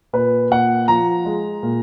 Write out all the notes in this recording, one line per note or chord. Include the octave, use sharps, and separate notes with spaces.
A#2 B4
A#2 F#5
F3 A#5
G#3
A#2